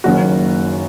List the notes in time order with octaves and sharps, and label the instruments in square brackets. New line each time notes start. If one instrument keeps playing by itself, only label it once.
[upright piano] F#1 F#2 D#3 A#3 F#4